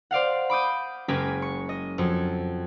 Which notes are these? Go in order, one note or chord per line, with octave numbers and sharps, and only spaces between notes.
C5 D5 F5 F#5
B5 D6 D#6 G6
F#1 G#3 C#4 G4 G#5 B6
C#6
D#5
F2 F#3